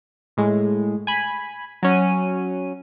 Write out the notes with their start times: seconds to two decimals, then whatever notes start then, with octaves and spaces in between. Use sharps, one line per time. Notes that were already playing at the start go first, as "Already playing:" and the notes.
0.37 A2 G#3
1.07 G#5 B5
1.83 F#3 C#4 D#7